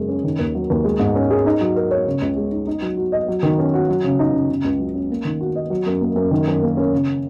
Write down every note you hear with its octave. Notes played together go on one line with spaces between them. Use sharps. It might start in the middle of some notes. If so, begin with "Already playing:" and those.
Already playing: F#2 C#3 G#3
C#4
D#3
D#2
F#3
D#2
G#3
G#2
C#4
G#4
D#4
F#3
A#4
C#5
C#3
C#2
G#3
D#4
D#4
F#3
F#4
D#5
F#3
D#3
C#4
F#4
F#3
C#3
D#4
C#3
C#3
C#2
F#3
C#4
A#3
D#3
F#4
D#5
F#3
F#2
A#3
F#2
D#3
F#2
A#3
C#4
C#3